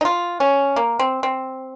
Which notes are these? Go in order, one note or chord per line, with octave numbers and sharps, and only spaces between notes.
D#4
F4
C#4
A#3
C4
C4